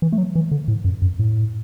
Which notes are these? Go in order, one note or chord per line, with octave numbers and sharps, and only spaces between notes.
E3
A3
F#3
E3
D3
A2
F#2
F#2
A2